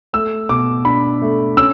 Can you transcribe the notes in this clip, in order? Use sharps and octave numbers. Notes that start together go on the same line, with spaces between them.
A3 E6
B2 D6
D4 B5
A3
C#4 E6